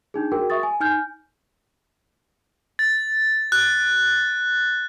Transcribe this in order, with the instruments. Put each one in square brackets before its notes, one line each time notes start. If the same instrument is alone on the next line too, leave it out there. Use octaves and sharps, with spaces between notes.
[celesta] D4 D#4 G#4
F#4 G#4 A#4 G5
E5 C#6 D#6 A6
G#5
D#4 G#5 F6 G6
[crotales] A6
F#6